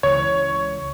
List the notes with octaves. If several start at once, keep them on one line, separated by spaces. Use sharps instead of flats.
C#2 E3 C#5